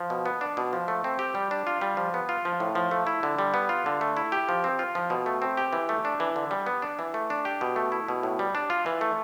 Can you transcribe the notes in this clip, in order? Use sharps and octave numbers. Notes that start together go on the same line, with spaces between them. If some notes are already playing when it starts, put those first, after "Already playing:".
Already playing: F3
B2
B3
D4
B2
F3
A3
C4
G4
G3
D4
F4
G3
F3
B3
F4
F3
A2
F3
A3
E4
D3
G3
B3
F4
D3
A3
E4
G4
F3
C4
F4
F3
B2
A3
C4
G4
E3
A3
D4
E3
D3
G3
B3
D4
E3
A3
D4
G4
B2
A3
E4
B2
A2
G3
D4
F4
E3
A3